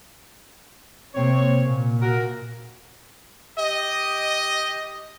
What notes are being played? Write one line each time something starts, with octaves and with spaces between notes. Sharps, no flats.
C3 A#3 C4 C#5
A#2
F#4 A#4
G4 D#5